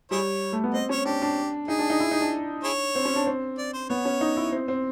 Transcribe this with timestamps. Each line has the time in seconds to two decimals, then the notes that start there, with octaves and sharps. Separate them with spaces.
0.11 G3 E4 G#4 C#5
0.52 A3
0.63 B3
0.74 C4 D#5
0.89 C#4 C#5
1.05 D4 G4
1.22 D4
1.68 D#4 G#4
1.79 D4
1.90 D#4
2.00 E4
2.11 D#4
2.21 D4
2.64 E4 G#4 C#5
2.95 C4
3.05 C#4
3.16 D4
3.26 C4
3.58 D5
3.73 C5
3.89 B3 C#5
4.05 C#4
4.21 D#4
4.37 E4
4.52 C4
4.68 C4